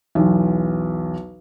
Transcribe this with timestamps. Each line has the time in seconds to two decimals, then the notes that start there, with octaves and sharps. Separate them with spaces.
0.15 B1 E2